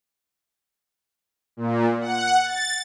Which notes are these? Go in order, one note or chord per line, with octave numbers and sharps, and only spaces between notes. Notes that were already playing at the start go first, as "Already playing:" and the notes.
A#2
F#5
A6